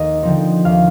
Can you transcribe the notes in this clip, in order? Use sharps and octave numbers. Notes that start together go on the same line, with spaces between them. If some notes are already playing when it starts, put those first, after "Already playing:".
Already playing: D#2 D#5
D3 F3 C4 D#4
D#2 F5